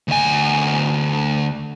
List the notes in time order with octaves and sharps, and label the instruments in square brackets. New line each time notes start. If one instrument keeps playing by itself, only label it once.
[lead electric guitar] D2 G#5